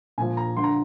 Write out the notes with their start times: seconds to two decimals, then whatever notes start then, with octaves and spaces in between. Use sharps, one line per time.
0.18 A#2 F3 G#5
0.37 A#5
0.56 G2 D3 F3 C6
0.64 A#5